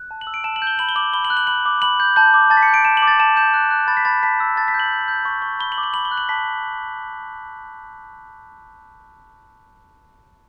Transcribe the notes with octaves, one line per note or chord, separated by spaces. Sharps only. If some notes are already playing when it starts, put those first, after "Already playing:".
Already playing: F#6
A5
F#7
E6
D7
A5 E7
F#7
G6
G7
B5 F#7
G7
D6 F#7
B5 G7
F#7
F#6
F#7
B5 F#7
D6
B5 F#7
G6
A5 G6
D6
A5 A6
B6
C#7
G6
D7
A5 E7
F#7
D6
A6
A5 E7
G6 E7
F#6
F#6
B5 A6
B6
B5 A6
A5 B6
E6
A5 A6
B6
G6
F#7
G6
G6
C#6
C#6
B5 G7
F#7
D6
F#7
B5 F#7
G7
F#6
F#7
A5 B6